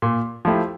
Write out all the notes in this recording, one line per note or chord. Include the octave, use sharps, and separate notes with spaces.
A#2
F3 A3 E4 G4